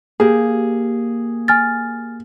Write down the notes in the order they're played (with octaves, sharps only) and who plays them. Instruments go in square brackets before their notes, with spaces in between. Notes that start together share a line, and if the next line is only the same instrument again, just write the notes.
[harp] A#3 G4 [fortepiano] G#4
[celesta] G#5 F6 A6